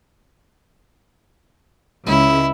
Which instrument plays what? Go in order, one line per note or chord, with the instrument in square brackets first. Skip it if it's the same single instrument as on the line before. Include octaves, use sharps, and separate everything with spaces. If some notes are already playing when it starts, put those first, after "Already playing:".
[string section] C#2 C#3 [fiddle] E4